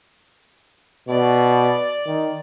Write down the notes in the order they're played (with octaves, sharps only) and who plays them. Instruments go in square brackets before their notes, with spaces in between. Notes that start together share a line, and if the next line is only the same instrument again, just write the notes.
[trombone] B2 [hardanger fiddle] D5
[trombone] D#3